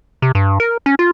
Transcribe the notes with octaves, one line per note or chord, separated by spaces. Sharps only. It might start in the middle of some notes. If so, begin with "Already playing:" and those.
C3
G2
A#4
C#4
F4